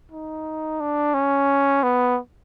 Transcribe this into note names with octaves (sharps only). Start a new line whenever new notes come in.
D#4
D4
C#4
B3